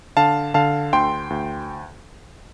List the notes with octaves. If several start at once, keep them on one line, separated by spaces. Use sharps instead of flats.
D3 F5 A5
D3 F5 A5
D2 G5 C6
D2